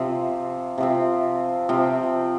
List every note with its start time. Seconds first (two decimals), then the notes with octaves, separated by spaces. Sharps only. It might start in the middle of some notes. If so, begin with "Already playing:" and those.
Already playing: C3 F3 C4
0.78 C3 F3 C4
1.69 C3 F3 C4